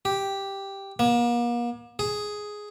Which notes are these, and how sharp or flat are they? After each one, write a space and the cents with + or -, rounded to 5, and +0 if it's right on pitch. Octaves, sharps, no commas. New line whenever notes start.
G4 +0
A#3 +40
G#4 +5